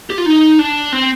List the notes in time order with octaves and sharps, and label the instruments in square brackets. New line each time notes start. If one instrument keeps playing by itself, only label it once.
[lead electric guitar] G4
F4
D#4
D4
C4